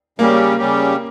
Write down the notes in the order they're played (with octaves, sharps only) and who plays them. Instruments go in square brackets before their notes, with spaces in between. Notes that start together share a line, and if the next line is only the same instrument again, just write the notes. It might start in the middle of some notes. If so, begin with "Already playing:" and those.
[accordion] C#3 G3 C#4 G4 [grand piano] A#3
[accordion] C#3 G3 C#4 G4